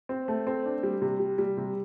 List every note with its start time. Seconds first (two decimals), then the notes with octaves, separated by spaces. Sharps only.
0.09 C4
0.28 A3
0.47 C4
0.65 D4
0.83 G3
1.02 C3
1.19 G3
1.38 G3
1.57 C3